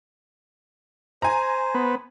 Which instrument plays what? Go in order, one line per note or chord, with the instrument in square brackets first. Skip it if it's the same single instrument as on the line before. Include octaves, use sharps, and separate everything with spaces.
[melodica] C5 [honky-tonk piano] G#5 A#5
[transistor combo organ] B3